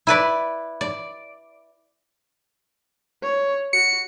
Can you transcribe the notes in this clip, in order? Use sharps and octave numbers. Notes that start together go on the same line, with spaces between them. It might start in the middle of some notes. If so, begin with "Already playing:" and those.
E4 B4 D5
D5
C#5
F#4 C#7